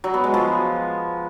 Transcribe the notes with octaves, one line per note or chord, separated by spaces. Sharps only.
F#3
B3
G#3
F3